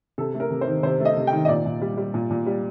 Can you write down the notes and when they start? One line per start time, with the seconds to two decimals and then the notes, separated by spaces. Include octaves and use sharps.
0.18 C3 A4
0.34 A3
0.40 A#4
0.50 C3
0.61 C5
0.67 D#3
0.83 C3 C5
1.00 A3
1.05 D#5
1.16 C3
1.27 G5
1.32 D#3
1.45 D#5
1.48 A#2 D5
1.66 A#2
1.82 G3
1.97 G3
2.14 A#2
2.31 A#2
2.46 G3